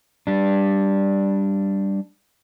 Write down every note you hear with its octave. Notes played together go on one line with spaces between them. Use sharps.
G3 D4